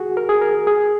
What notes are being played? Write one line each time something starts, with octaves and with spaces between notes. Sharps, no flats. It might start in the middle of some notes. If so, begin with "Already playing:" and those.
Already playing: F#4 G#4
A#4
G#4
A#4
G#4